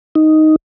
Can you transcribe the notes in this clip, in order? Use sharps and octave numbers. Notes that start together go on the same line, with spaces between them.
D#4